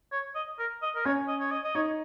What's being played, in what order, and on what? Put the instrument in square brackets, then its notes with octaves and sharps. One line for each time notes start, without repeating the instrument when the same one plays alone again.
[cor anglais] C#5
D#5
A#4
D#5
A#4
[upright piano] C#4 [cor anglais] C#5
[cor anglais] D#5
C#5
D#5
D#5
[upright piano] D#4 [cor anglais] C#5